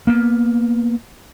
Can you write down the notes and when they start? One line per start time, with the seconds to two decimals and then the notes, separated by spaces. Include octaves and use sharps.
0.07 A#3 B3